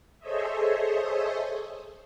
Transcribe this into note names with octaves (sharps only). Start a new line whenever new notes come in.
G#4 A4 C5 C#5 D#5 E5